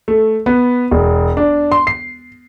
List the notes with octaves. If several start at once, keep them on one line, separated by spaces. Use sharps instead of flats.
A3
B3
E1
D4
C6
C7